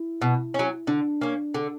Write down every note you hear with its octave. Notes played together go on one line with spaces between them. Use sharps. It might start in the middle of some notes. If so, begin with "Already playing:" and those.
Already playing: E4
B2
F#3 C#4
D3 D4
A#3 C#4
D3